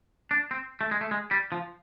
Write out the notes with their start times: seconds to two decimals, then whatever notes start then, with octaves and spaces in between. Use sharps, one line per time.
0.31 D4
0.51 C4
0.81 A3
0.91 G#3
1.01 A3
1.11 G#3
1.31 G3
1.52 F3